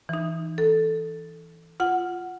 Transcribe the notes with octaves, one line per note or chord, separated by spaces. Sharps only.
E3 D#4
A4
F4 F#5